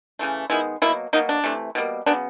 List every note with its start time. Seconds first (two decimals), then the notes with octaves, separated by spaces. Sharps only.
0.19 C#3 E3 A3
0.50 D#3 G#3 B3 E4
0.82 B2 F#3 A#3 E4
1.13 B2 F#3 A#3 D#4
1.29 D4
1.44 C3 E3 A3
1.75 B2 G3 A#3
2.06 C#3 F#3 B3 D4